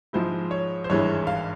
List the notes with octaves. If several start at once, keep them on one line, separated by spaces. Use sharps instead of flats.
G#2 F3 G#3 E4 C5
C#5
C5
G#1 G2 E3 G#3 C#5
F5